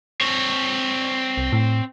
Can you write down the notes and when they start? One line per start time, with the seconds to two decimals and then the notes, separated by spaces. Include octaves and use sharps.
0.21 C4 C#5
1.37 C2
1.53 A2